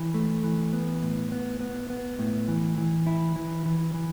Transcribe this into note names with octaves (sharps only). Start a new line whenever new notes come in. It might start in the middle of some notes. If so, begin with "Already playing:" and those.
Already playing: E3
A3
E3
B3
A2
B3
B3
B3
A2
E3
E3
E4
E3
E3
E3